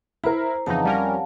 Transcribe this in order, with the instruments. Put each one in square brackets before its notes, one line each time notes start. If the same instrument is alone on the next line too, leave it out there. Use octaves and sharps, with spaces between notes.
[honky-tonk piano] E4 A#4 [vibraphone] C5 A#5
[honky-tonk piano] F2 [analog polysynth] C#3 E3 D#4 [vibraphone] F5 F#5 A5
[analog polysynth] G3 C#4 A#4